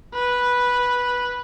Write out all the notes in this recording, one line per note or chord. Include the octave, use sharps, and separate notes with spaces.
B4